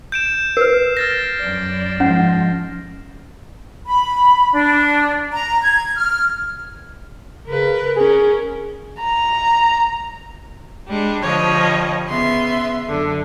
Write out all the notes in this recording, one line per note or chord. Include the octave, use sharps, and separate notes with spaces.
G6 D7 E7
A#4 B4 C7
F6 A6 A#6
F#2 D5
G#2 F3 C#4 F#5
B5
D4
A#5
G#6
F6
C#3 A#4 B4
C#4 G#4 A#4
A#5
G3 G#3 D4
D3 F3 G3 C#5 D#5
C#3 B3 E5 C6
F#2 D3